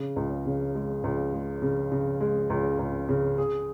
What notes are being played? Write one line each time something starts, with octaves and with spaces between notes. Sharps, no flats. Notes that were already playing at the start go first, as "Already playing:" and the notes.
Already playing: C#3
C#2
C#3
G#3
C#2
G#3
C#3
C#3
G#3
C#2
C#2
C#3
G#4